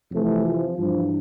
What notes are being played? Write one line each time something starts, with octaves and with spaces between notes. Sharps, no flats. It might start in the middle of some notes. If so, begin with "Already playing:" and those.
F2 C3 E3 A3
F3
G2 E3 F3